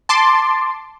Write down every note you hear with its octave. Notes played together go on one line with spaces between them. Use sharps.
A5 C6 D6